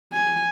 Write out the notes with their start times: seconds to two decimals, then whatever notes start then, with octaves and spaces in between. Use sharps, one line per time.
0.13 G#5